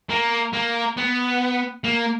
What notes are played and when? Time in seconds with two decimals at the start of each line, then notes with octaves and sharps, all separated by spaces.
0.10 A#3
0.53 A#3
0.97 B3
1.84 A#3